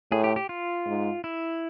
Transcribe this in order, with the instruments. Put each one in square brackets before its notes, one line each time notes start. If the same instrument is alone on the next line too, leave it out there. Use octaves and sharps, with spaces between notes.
[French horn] A2 [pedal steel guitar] G#4
[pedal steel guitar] G4
G4
F4
[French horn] G#2
[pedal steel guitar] E4